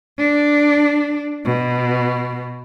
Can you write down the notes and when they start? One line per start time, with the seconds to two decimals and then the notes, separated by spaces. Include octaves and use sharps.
0.18 D4
1.45 B2